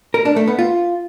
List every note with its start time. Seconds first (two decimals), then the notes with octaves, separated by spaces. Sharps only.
0.14 A#4
0.25 D4
0.36 A3
0.47 B3
0.59 F4